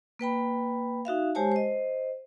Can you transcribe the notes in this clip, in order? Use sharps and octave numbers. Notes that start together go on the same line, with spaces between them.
A#3 B4 G5 B5
D#4 F#4 E5 F5
G#3 G4 C5 C#5 G#5 A5
C5 D#5